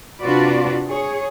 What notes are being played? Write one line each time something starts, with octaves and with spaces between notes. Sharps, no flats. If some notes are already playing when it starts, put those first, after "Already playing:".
C3 D4 F4 F#4 B4 D5
G#4 C#5